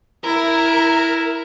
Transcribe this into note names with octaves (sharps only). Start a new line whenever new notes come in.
E4 A#4